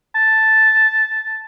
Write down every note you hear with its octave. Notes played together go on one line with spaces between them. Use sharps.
A5